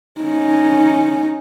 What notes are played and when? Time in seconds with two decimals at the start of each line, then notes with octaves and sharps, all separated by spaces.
0.21 C#4 D#4